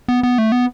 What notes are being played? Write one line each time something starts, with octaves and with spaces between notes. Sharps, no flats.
B3
B3
A3
B3